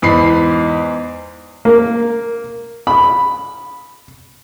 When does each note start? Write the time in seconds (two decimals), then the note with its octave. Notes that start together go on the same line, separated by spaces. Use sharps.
0.02 E2 G#2 B5 C7
1.65 A#3
2.87 B5